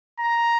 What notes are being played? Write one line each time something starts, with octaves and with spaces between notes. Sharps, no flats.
A#5